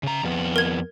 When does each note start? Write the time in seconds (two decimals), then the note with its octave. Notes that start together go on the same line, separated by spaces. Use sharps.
0.03 C#3 A#5
0.23 F2 B3
0.56 A#4 G#6